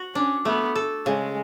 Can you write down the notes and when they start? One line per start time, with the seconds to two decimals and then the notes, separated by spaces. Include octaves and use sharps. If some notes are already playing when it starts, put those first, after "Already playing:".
Already playing: F#4
0.15 C#4 D4
0.45 A3 B3
0.75 A4
1.06 C#3 G#3